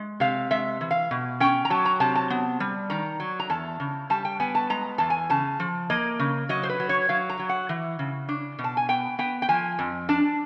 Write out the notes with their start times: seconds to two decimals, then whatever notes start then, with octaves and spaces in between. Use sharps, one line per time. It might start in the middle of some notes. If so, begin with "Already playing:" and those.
Already playing: G#3
0.20 C3 F5
0.51 G#3 E5
0.81 E3
0.91 F5
1.11 B2
1.40 C#4 G5
1.65 A#5
1.70 F#3 A5
1.85 A#5
2.00 C3 A5
2.15 A5
2.30 B3
2.60 G3
2.90 D#3 A#5
3.20 F#3
3.40 A#5
3.50 E2 A5
3.80 C#3
4.10 G3 A5
4.25 G5
4.40 B3 G#5
4.55 A5
4.70 G#3 A#5
4.98 E2 A5
5.10 G#5
5.30 C#3 A5
5.60 F3
5.90 A#3 D#5
6.19 C#3
6.49 F#3 D#5
6.63 C5
6.69 B4
6.80 F#3
6.89 C#5
7.09 F#3 F5
7.29 A#5
7.39 F#3
7.49 F#5
7.69 E3
7.99 C#3
8.29 D4
8.59 B2
8.64 A5
8.77 G#5
8.89 B3 G5
9.19 B3 G5
9.42 G5
9.49 F3 G#5
9.79 F2
10.09 D4 A5